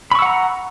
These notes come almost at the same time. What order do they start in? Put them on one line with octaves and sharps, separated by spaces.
B5 C#6 E6 F#5 A#5